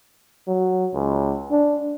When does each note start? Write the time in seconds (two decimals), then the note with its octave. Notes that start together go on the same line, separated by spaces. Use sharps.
0.48 F#3
0.94 C#2
1.51 D4